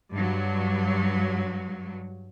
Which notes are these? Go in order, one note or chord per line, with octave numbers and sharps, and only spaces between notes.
G2 F#3